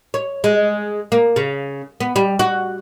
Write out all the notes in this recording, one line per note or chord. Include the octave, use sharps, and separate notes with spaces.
C#5
G#3
A#3
C#3
B3
G3
F#4